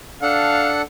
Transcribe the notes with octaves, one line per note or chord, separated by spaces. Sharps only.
D4 A4 F5 F#5